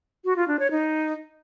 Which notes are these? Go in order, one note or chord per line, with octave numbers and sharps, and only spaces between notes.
F#4
F4
D4
C#5
D#4